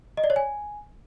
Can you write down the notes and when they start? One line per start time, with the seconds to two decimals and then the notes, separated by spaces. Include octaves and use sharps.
0.17 D#5
0.24 D5
0.30 C#5
0.36 G#5